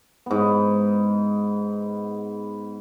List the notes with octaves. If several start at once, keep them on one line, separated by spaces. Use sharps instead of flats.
G#2 B3